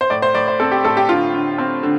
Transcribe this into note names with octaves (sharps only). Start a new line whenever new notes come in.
C5
A2 D5
C5
A2 D5
C5
C4 A4
G4
A2 A4
G4
D3 F4
D3
C4
D3